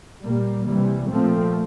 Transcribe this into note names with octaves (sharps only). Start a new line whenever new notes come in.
A#2 G3 A#3
C3 E3 G3
A#2 F3 A3 C4